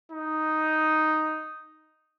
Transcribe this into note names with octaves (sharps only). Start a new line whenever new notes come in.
D#4